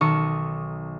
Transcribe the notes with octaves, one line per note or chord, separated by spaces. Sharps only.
B1 D#3 D#4 A4 C#6 D#6